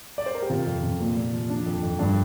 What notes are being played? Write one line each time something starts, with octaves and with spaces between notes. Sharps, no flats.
D5
C5
A#4
G4
C3 F4
F2
C3
A#2
A#2
F3
F3 D4
F2
F2
G2 D4